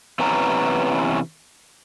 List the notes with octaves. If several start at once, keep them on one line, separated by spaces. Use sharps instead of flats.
C3 E3 B3 C#4 A#5